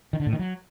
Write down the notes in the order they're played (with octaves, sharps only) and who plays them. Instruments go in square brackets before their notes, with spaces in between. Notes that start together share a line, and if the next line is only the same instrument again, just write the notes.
[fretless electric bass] D#3
D3
A2
D#3
F#3